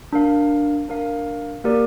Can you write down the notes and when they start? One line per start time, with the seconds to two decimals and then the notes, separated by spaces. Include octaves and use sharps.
0.12 D4 A#4 F5
0.89 D4 A#4 F5
1.64 A#3 G4 A#4 D5